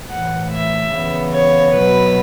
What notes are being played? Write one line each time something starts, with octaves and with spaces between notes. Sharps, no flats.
A2 E3 A3 F#5
E5
C#3 E3 B3
C#5
B2 F#3 B3 B4